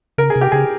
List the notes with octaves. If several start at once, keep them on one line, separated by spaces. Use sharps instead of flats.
C#3 A#4
G#4
C3
G4
C#3 G#4